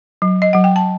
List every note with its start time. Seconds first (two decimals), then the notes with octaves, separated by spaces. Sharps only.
0.22 F#3
0.42 D#5
0.53 F#3 F#5
0.64 G5
0.76 A5